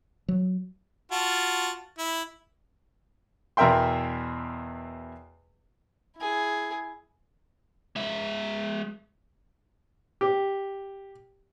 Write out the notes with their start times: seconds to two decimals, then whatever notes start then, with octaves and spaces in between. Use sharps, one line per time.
0.28 F#3
1.12 F4 F#4 A5
1.98 E4
3.57 E2 B2 A#4 E5 G5 C6
6.17 E4 G#4
7.96 G#3 E5
10.21 G4